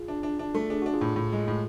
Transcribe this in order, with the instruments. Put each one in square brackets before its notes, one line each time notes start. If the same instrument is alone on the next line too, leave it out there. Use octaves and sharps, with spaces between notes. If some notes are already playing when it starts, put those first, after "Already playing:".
Already playing: [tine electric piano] F4 G#4
[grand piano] D4
D4
D4
A3
[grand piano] D4 [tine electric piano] G#4
[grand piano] D4 [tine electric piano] F#4
[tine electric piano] F4 G#4
[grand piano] A2
A2
G#3
A2